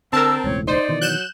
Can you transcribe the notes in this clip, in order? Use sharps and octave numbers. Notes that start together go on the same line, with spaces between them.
D3 C4 A#4 A5 E6
E1 C#2 A2 C#5
D#4 C5 D5
B2 D#3 E3
F#3 F#6 G6 E7